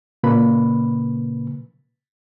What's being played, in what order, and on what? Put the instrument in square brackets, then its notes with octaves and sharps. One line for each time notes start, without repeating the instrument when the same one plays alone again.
[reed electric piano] A#2 C#3 A#3 B4 B5